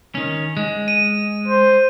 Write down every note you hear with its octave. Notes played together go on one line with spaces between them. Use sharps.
D#3 C#4
G#3
D#7
C5